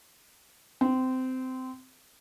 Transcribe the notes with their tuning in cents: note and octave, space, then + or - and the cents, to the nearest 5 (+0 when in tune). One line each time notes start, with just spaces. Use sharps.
C4 -20